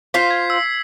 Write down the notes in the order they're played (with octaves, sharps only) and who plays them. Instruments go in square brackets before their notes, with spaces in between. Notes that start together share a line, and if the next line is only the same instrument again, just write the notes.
[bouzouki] F4 C5 [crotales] B6 C7
[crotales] G#6
E6